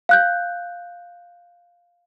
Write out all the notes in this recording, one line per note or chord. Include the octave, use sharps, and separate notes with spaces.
F5 F#6 G6